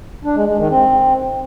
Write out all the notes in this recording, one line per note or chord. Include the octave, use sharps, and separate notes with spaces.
D4
G#3
G#3
D#3
C4